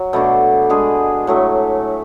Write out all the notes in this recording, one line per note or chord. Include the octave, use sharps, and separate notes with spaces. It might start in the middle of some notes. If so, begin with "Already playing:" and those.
Already playing: F#3
B2 A3 D4
G#3 D4 G#4
A2 F#3 A3